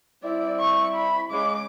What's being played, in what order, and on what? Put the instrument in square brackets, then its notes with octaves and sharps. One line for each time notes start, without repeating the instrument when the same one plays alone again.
[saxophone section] G3 C4 E4 [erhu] D5
[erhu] C#6
B5
[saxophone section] C#3 G#3 [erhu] D6